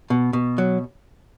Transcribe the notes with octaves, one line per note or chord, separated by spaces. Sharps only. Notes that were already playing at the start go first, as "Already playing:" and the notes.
B2
B2
F#3